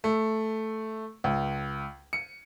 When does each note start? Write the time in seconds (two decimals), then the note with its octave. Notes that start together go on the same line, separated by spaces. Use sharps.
0.04 A3
1.24 C#2
2.13 C#7